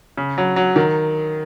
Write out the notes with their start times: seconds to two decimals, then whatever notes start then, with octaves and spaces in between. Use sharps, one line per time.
0.17 C#3
0.38 F#3
0.56 F#3
0.76 D#3